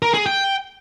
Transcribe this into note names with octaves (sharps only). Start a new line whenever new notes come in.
A#4
G#4
G5